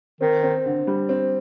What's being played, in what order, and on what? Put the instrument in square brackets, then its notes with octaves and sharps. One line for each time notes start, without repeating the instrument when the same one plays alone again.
[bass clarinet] D#3 [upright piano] C4
[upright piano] C4
D3
G3
C4